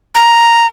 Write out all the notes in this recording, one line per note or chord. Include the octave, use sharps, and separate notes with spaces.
A#5